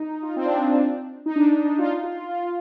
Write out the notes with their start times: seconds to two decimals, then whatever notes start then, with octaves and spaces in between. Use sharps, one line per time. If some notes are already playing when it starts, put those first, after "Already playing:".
Already playing: D#4
0.22 F4
0.36 C4
0.45 D4
0.51 C4
0.65 D4
1.26 D#4
1.36 D4
1.50 D4
1.64 D4
1.78 F4
2.03 F4
2.29 F4